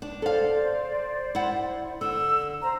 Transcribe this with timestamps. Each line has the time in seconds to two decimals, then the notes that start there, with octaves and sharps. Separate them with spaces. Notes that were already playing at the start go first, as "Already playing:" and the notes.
0.02 D4
0.22 A4 C5 D5 F5
1.35 E4 F#5
2.01 D3 E6
2.62 C5 A#5